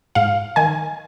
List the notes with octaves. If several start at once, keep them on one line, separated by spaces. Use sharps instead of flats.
G#2 F5
D#3 G#5